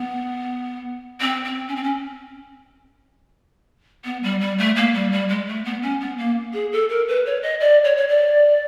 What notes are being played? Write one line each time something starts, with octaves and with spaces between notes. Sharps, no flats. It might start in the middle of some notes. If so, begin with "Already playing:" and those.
Already playing: B3
C4
C4
C#4
C4
C#4
B3
G3
G3
A3
A#3
G3
G3
G#3
A3
B3
C#4
B3
A#3
G#4
A4
A#4
B4
C#5
D#5
D5
C#5
C#5
D5